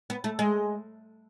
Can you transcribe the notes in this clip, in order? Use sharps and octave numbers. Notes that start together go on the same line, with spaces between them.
B3
A3
G#3